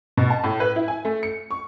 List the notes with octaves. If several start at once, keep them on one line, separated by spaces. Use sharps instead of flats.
B2
A5
A2
B4
E4
G#5
A3
C#7
C#6